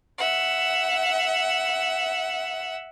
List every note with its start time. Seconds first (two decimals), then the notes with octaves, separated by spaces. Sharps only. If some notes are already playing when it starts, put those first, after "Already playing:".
0.19 E5 F#5